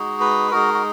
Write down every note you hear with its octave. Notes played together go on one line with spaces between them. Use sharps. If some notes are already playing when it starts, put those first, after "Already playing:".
Already playing: G#3 D#4 F#4
B4
G#3 D#4 F#4 A#4
F#4